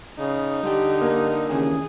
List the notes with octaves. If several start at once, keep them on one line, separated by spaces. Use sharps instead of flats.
C#3 D#4
D3 G3 G4
A#3
D#2 C#3 E3 G#4